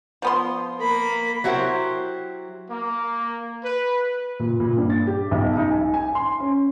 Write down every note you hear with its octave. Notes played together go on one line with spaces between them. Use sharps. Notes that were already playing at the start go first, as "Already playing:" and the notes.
F3 B3 C6
A#3 B5
F#3 E4 F#4 G4 C5
A#3
B4
A#2
A#2
G2
A6
G4
B1
D#4
G#5
G#5
C6
C#4